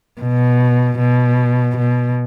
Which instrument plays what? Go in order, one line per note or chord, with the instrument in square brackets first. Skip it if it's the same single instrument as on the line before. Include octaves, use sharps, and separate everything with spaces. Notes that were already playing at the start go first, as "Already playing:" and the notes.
[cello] B2
B2
B2